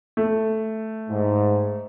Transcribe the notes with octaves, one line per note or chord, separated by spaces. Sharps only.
A3
G#2